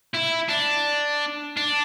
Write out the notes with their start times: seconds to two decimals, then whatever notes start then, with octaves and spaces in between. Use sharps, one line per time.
0.14 E4
0.49 D4
1.57 D4